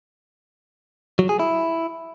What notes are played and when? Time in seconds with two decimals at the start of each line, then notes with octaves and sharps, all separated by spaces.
1.19 F#3
1.29 G#4
1.39 E4